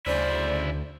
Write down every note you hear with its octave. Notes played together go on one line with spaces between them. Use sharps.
D2 C#3 E4 C5 D5